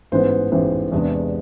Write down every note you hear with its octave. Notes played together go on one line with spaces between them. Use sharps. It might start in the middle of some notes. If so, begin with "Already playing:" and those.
A1 G#2 E3 B3 C5
A1 G#2 E3 B3 C5
E2 C3 G#3 B3 D4